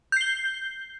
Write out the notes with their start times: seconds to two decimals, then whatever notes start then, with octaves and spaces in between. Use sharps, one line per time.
0.12 G6
0.17 C7
0.21 G7